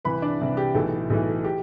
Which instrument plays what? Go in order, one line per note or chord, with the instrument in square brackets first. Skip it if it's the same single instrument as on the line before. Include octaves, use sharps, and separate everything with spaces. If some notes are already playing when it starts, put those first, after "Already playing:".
[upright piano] C2 C3 E3 B4 B5
D4 D5
C2 C3 E3
G4
B1 A2 E3 A4
B1 A2 E3
G4